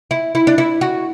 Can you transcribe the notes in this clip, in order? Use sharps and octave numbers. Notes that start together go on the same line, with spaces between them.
E4
E4
D4
E4
F#4